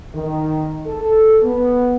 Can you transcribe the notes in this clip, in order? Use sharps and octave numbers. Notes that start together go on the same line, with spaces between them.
D#3
A4
B3